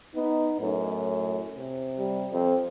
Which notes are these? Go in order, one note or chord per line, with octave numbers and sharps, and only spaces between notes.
B3 D#4
F#2 A2
C3
G3
F2 C4